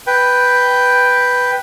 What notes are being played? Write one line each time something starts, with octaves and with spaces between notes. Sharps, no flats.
B4 G5